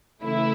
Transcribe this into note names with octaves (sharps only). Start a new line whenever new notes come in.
C#3 E3 A3 E4